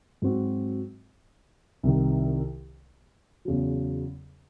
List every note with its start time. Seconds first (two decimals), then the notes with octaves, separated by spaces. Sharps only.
0.22 G#2 F#3 C4 F#4
1.83 C2 C3 D#3
3.45 E2 C#3 F#3